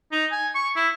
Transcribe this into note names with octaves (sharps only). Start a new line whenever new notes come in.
D#4
G#5
C#6
E4